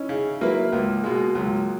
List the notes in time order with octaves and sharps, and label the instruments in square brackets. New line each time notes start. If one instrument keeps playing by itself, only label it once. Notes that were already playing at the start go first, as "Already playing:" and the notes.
Already playing: [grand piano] C#4 D#4 E4
[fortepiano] C#3
F#3 A#3 E4 B4
[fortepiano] C#2 [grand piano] A#3
[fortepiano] B2 G#3
[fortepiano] C#2 [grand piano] F#3